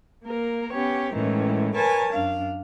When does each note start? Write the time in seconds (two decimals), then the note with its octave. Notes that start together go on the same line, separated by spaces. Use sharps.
0.23 A#3 A#4
0.72 B3 C#4 G4 C#5
1.12 A2 D#3 E3 G#3 C#4
1.74 A#4 B4 C#5 G#5 A5
2.11 F#2 D4 F5